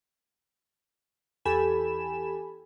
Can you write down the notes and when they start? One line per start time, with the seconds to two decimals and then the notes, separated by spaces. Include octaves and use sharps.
1.45 E2 G4 A4 G#5 B5 E7